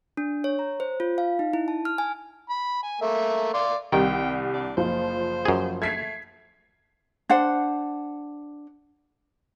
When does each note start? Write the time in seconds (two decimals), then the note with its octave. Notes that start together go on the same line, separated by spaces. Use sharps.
0.17 D4
0.44 C#5
0.59 A#5
0.80 C5
1.00 F4
1.18 F5
1.39 D#4
1.53 E4
1.68 A5
1.85 F6
1.98 G#5
2.49 B5
2.83 G#5
3.01 A3 A#3 E5
3.54 D5 F5 C6
3.93 C2 D#3 G3 G5
4.54 D4
4.77 F#1 F3 C5
5.45 F#2 G#4
5.82 A3 G#6 B6 C7
5.97 A3
7.29 D4 C5 F#5